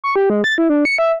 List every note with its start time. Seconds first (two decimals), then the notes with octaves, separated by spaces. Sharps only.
0.04 C#6
0.16 G4
0.30 G#3
0.44 A6
0.58 E4
0.69 D4
0.85 C#7
0.98 E5